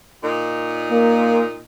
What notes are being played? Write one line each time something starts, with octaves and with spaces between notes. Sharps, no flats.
A#2 D#4
A#3